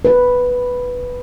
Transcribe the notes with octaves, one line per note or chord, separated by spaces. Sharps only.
B4